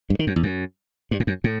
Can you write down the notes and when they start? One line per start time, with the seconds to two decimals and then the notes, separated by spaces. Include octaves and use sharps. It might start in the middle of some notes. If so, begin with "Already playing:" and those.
0.10 G2
0.19 D#3
0.27 F#2
0.36 E2
0.43 F#2
1.11 G2
1.20 A2
1.27 F#2
1.44 A2